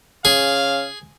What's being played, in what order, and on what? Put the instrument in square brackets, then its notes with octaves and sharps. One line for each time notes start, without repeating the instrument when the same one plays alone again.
[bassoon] C#3 [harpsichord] G#4 [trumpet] F5